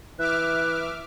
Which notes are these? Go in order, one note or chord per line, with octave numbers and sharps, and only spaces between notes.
E3 E5 D6 F6 F#6